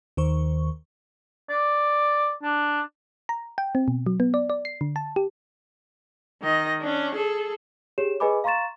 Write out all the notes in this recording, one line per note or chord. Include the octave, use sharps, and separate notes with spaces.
D#2 D#3 C5 C#6
D5
D4
A#5
G5
C4
B2
F#3
B3
D5
D5
C7
D3
A5
G4
D#3 D#5
C#4 D4
G#4 A4
G4 G#4 C#5 E7
G#4 B4 D#5 G#5 B5 D6
F5 A#5 C6 C#6 A6 E7